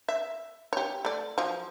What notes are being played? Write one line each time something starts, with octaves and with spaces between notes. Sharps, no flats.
E5
G4 C#5
A3 D5
F3 F#3